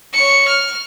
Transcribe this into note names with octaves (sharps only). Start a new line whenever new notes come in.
C#5 C#7
F6